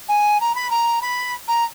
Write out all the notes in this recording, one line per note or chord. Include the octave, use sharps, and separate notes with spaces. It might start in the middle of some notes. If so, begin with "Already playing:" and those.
G#5
A#5
B5
A#5
B5
A#5